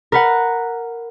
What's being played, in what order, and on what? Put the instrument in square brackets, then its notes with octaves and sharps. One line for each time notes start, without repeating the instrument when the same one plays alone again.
[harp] A#4 B4 F#5